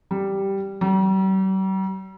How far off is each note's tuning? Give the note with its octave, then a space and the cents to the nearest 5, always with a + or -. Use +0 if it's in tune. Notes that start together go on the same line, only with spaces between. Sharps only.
G3 -5
G3 -45